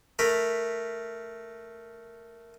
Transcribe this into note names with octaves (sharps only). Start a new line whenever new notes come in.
A3 A#4 B5